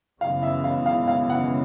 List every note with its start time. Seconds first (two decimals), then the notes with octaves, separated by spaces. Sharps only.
0.21 F#2 C#3 E3 G#3 B3 F5
0.43 E5
0.64 F5
0.86 F5
1.08 F5
1.30 F#5